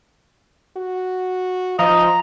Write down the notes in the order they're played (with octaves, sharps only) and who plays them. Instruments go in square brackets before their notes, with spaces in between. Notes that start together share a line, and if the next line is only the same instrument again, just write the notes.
[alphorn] F#4
[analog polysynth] F3 [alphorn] F4 [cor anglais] D#5 [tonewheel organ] A#5